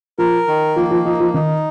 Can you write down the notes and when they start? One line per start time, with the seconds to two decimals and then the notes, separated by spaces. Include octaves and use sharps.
0.18 F3 A#4
0.47 D#3
0.76 F3 A#3
0.91 F3
1.05 F3 D#4
1.20 F3
1.34 D#3 D#4